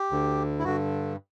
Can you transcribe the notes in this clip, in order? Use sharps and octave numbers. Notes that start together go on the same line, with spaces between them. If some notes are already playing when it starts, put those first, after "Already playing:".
Already playing: G4
D2 D3
E4
G2 D3 F#4